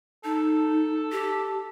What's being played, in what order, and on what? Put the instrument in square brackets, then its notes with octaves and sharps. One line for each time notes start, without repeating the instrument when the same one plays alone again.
[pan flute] D#4 [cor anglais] A4
[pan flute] G4